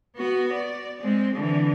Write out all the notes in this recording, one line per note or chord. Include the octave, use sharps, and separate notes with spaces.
B3 F#4
D5
G#3 C4
D3 E3